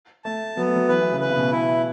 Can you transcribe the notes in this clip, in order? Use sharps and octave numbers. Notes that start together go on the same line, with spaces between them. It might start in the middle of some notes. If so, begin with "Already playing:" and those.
A3 A5
F#3 B3
A3
F#3
E3 B4
E3
C#3
B4
C#3
B2
E4